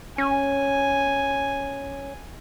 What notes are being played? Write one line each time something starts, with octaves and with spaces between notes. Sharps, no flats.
C#4 G#5